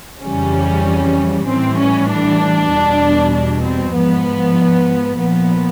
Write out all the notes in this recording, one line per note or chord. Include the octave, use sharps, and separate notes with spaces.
F2 C#3 E3 G3 C#4
A2 E3 G3 C4
C#4
D4
E2 B2 G3
D4
C4
G#2 F3 B3
A#2 F3 B3